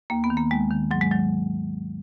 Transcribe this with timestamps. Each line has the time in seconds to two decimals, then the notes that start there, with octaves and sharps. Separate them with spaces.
0.10 D#2 A#3
0.24 B3
0.30 D#3
0.37 A#3
0.50 D#2 G#3
0.71 D#3
0.91 G#2 F#3
1.01 G#3
1.11 D#3 F#3